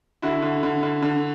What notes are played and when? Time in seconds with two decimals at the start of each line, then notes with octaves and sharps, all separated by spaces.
0.22 D3 E4 F#4
0.42 D3
0.63 D3
0.83 D3
1.02 D3